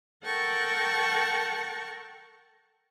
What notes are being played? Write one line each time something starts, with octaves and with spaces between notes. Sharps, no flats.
A4 A#4 F#5 G5 A5 C#6